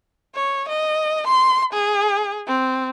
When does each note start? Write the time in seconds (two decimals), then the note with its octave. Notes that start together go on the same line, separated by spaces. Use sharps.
0.35 C#5
0.69 D#5
1.27 C6
1.74 G#4
2.47 C4